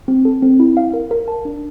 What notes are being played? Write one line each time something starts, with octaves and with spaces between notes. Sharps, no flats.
C4
A4
C4
E4
F5
A#4
A#4
A5
D4